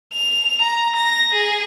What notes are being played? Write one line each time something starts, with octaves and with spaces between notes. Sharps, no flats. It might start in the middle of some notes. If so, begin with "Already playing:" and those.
F7
A#5
A#6
G#4